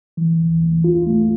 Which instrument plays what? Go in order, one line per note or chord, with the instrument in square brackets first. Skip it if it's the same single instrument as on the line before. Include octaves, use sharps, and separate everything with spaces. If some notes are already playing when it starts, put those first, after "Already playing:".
[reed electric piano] E3
D#2
D#2
F4
A3